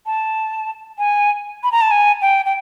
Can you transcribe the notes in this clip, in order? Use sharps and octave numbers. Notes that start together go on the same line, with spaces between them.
A5
G#5
B5
A#5
A5
G#5
G5
G5